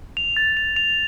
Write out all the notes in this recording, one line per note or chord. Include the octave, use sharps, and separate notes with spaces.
F7
A6
F7
F7